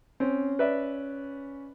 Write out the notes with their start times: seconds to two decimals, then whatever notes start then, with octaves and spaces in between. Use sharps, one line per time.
0.20 C4 C#4
0.59 B4 D5 E5